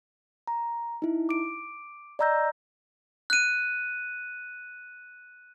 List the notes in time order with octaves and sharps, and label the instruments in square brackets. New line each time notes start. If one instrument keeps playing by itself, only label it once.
[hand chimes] A#5
D#4 E4
D6 D7
D5 D#5 A#5 E6 G6 A#6
[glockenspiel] F#6 D#7